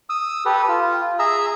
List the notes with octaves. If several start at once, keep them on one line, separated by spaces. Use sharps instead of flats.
D#6 E6
G4 A4 B4
F4
G#4 E5 A#5 E6